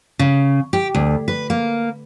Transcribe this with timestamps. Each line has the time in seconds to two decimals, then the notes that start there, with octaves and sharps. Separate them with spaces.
0.19 C#3
0.73 G4
0.95 D2
1.28 B4
1.50 A#3